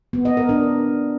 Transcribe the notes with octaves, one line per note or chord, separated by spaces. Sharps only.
B3
D#5
A#4
D4